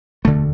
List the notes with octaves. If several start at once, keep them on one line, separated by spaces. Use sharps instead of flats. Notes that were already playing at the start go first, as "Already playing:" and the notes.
E1 D2 D3 A3